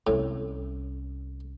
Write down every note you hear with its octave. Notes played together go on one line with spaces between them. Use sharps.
C2 A2 C#4